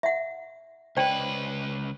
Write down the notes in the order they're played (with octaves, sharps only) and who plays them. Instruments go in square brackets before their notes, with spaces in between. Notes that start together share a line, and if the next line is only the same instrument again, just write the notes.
[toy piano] E5 F#5
[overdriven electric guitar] C#2 B4 [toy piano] C5 D5 G5